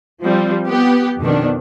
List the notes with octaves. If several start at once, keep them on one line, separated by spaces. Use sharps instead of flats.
F3 G3 C4
B3 G4
F2 B2 D#3 B3 D4